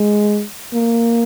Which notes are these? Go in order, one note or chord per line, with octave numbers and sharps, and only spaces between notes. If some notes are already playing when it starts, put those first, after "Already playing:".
Already playing: G#3
A#3